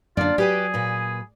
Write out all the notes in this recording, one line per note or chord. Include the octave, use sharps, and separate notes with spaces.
F#2 D3 A#3 D4 F4 D5
F#3 G4 G#4 B4 G5
A#2 B4